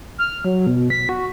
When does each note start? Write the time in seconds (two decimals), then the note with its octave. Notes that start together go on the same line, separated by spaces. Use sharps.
0.18 F6
0.44 F#3
0.67 B2
0.90 B6
1.09 F#4